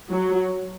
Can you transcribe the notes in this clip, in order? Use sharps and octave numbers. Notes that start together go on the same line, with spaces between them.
F#3